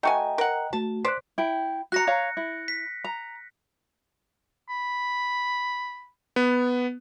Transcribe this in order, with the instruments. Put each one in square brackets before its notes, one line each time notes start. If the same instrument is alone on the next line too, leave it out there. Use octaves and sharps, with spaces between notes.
[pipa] A3 F#4 G#5 [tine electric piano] D#5 G5 A#5
[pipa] A#4 F#5
[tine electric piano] A3 F#4 [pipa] A5
[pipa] C5 D5 [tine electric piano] F#6 B6
[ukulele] E4 G5
[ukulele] F#4 A#5 [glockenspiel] F#6 A#6 C#7
[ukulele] C#5 F5 A#5
E4
[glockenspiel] B6
[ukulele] A#5
[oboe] B5
[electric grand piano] B3